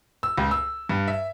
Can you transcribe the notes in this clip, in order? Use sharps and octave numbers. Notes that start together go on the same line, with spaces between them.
E6
C#2
E6
G2
E5